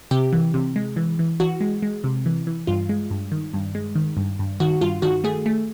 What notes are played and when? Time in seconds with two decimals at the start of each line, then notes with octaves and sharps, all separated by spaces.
0.11 C3 G4
0.33 E3
0.54 C3
0.76 G#3
0.96 E3
1.19 E3
1.40 E3 F#4
1.61 G#3
1.82 G#3
2.04 C3
2.26 E3
2.47 E3
2.67 G2 F4
2.89 G#3
3.11 G2
3.32 D#3
3.54 G2
3.75 G#3
3.95 D#3
4.17 G2
4.39 G2
4.60 D#3 F#4
4.81 G2 F4
5.02 D#3 F#4
5.24 A3 G#4
5.46 A3